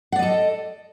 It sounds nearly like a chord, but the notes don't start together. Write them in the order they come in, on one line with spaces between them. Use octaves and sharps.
F#5 D5 D#5 A4